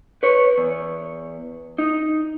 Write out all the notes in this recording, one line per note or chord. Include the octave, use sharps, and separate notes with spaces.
B4 C#5
E2
D#4